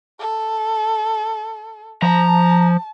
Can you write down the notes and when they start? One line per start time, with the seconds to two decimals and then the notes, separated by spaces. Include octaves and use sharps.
0.20 A4
2.02 F3 A5 A#5